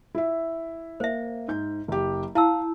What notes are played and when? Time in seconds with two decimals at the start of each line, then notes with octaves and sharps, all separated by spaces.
0.15 E4 E5
1.00 A#3 C5 E5
1.48 G#2 G6
1.88 F#1 G4
2.35 E4 F5 A5 E6